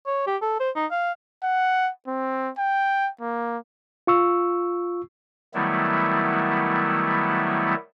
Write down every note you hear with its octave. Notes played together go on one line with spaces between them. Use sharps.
C#5
G4
A4
C5
D#4
F5
F#5
C4
G5
A#3
F4 C#6 E6
D#3 F#3 G3 A3 B3 E4